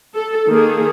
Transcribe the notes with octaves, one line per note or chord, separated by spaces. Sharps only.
A4
D#3 A#3 G#4 A4